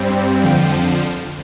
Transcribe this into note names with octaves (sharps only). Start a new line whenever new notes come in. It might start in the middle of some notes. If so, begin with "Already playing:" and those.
Already playing: G2 G3 C4
F2 D3 F3 G5